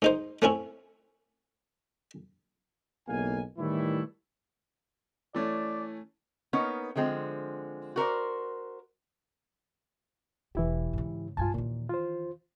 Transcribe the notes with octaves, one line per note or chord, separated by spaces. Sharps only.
G#2 D#4 C5
A3 C4 C#4 E4
F#1 B1 E2 A#3 F5 G#5
A2 D#3 E3 G3 A3 E4
E3 A3 C#4 D5
A#3 B3 C#4 D#4 A#4
D3 F3 G#3 C4
F#4 A#4 C5 D5
E1 E3 E4 G4
G#2 C#3
E2 G2 F4 G#5 A5
D#2 A#2 E3
F4 C5